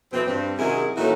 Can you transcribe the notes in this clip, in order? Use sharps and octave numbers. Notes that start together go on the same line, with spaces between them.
F2 B2 E3 C4
G2 C4
F#2 C3 D#3 E4 G#4
A#2 E3 A3 C#4 D#4 F#4